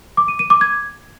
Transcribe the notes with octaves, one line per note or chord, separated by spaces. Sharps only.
D6
D#7
D#7
D6
G#6